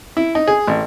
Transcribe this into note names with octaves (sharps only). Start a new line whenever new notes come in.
E4
D#4
G#4
A1